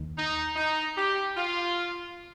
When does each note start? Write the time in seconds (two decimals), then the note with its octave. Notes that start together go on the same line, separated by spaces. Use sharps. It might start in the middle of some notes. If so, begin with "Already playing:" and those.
Already playing: D#2
0.17 D#4
0.56 D#4
0.96 G4
1.36 F4